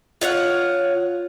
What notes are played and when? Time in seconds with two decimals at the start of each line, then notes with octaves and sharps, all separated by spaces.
0.21 F4 C#5 E5 F#5